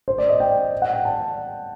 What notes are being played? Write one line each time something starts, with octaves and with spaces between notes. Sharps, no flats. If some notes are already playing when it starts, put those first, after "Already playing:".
C5
D5
D#5
G5
F#5
G5
A5